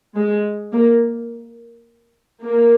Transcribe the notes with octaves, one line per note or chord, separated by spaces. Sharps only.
G#3
A#3
A#3